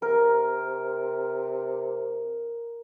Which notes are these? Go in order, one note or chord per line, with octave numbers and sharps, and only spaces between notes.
C3 A#4